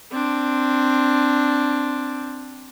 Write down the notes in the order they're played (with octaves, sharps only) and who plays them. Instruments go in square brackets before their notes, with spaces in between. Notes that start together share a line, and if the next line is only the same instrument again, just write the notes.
[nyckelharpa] C4 D4